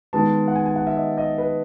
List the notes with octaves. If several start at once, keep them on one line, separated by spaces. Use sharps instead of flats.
D#3 G#3 B3 A5
F#5
G#5
G#5
F#5
E5
D#5
D#5
B4